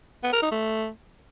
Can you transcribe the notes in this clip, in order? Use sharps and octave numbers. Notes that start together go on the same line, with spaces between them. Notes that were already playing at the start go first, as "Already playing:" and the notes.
B3
A#4
D#4
A3